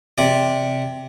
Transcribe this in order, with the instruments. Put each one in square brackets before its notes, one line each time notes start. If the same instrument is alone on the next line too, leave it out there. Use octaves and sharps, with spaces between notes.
[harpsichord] C3 D5